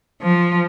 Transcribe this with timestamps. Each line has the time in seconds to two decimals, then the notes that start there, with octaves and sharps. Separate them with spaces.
0.22 F3